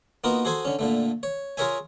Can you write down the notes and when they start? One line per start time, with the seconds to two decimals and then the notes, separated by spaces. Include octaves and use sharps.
0.24 A#3 B3 D#4 F4 F#4 A#4
0.45 F#4 G#4 A4 C5 G#5
0.65 D3 C#4
0.79 A#2 D3 A3
1.23 C#5
1.57 F4 G#4 A#4 C#5 E5 G#5